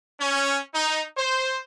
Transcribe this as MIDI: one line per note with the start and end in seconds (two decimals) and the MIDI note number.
0.19 0.58 61
0.73 1.02 63
1.15 1.58 72